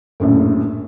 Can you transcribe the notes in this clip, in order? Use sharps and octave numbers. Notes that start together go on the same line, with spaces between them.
A#1 F#2 A2